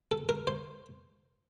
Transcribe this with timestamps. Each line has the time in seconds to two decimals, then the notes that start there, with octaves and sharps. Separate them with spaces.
0.11 A4
0.29 A#4
0.47 C5